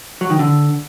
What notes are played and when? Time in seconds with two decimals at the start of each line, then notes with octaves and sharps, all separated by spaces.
0.21 F#3
0.30 D#3
0.39 D3